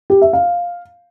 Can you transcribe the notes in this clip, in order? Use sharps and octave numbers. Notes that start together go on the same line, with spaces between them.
G4
E5
F5